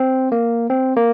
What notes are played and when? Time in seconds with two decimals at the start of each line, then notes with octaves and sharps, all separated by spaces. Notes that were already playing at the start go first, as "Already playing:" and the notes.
Already playing: C4
0.32 A#3
0.70 C4
0.96 A#3